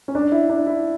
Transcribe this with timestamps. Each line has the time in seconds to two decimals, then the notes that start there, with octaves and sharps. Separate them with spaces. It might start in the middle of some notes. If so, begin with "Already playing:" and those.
0.08 C#4
0.15 D4
0.32 E4
0.50 D4
0.67 E4